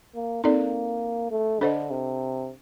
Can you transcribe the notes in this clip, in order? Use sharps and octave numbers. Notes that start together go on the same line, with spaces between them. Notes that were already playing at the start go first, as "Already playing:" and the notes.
A#3
A#3 C4 D#4 A4 D5
A3
D3 D4 A4 C5 D#5
C3